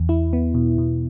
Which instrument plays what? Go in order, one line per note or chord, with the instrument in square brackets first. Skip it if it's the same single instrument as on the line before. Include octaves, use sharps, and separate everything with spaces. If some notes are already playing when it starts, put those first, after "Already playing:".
Already playing: [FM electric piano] E2
E4
B3
B2
B2